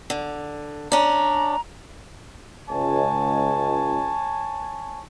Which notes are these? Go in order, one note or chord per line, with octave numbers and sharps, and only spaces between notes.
D3
C#4 D4 A#5
C#2 C#5 G#5 A5